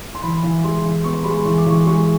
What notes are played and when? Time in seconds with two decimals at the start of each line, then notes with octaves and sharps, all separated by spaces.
0.15 C6
0.23 E3 B5
0.43 E3
0.64 G#3 C6
0.85 E3
1.04 B3 C#6
1.13 C6
1.23 G#3 B5
1.31 C6
1.45 E3 C#6
1.58 D6
1.66 E3 C#6
1.86 G#3 C#6